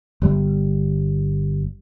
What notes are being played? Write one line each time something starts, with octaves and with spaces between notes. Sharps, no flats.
G1 G3